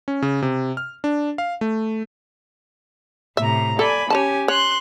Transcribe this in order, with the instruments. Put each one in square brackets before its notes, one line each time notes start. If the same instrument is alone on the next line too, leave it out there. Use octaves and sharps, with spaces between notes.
[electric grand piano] C#4
C#3
C3
F6
D4
F5
A3
[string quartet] A2 C3 A#5 [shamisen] E5
[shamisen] A4 [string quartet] D5 G#5 B5
[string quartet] C#4 G4 G#5 [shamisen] C#5 D5 A5
[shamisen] C#5 [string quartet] C6 F#6